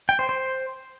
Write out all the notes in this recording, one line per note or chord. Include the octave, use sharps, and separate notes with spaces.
G5
C5
C5